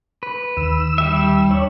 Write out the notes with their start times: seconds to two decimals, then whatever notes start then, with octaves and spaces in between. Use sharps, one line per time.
0.23 B4
0.57 D#2 E6
0.98 G3 G4 E5
1.50 D4 C#5